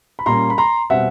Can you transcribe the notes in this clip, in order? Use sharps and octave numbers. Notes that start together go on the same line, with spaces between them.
B5
A#2 G3 A#3 C#4 A#5 C6
B5
A#5 C6
B2 G3 C4 E5 F#5